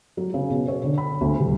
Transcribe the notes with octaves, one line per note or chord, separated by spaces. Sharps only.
F#3
C#3
B2
C#5
D3
B5
D2
D#1